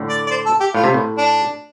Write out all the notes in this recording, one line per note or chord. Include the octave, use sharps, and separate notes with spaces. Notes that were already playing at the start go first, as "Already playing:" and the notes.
Already playing: A2 D3
D5
D5
C5
A4
G4
A2 F4
C3
A2
D4